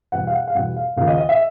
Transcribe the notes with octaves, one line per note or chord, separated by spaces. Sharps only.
E2 B2 G3 F#5
F5
F#5
F5
E2 B2 G3 F#5
F5
D#2 C#3 F3 A#3 F5
D#5
D#5
E5